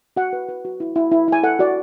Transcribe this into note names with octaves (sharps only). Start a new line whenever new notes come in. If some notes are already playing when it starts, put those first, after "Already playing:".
F#4 F#5
B4
B4
F#4
E4
E4
E4
E4 G#5
A4 F#5
F#4 D5